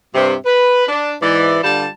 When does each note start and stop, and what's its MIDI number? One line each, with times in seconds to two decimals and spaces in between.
0.15 0.34 43
0.15 0.34 48
0.46 0.85 71
0.88 1.14 62
1.23 1.59 44
1.23 1.59 52
1.23 1.59 74
1.64 1.87 43
1.64 1.87 50
1.64 1.87 55
1.64 1.87 65
1.64 1.87 81